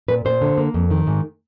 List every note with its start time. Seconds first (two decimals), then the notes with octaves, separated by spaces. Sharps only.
0.08 A#2 B4
0.25 A#2 C5
0.41 D3
0.58 A#3
0.74 F2
0.91 D#3
1.07 G#2